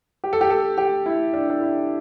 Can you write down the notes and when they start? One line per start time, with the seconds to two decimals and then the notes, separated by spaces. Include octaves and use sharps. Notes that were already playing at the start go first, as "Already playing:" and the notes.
0.24 G4
0.33 A4
0.41 G4
0.50 A4
0.78 G4
1.06 E4
1.34 D4
1.50 D4
1.61 E4